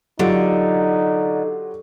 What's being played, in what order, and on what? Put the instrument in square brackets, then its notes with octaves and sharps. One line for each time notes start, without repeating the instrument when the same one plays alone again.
[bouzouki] D3 [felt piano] F#3 F4 G4 [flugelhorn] D#4